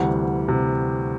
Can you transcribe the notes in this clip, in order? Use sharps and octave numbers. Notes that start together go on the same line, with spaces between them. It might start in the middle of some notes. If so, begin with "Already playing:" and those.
Already playing: D2 C3 E3 G3 F#5
C3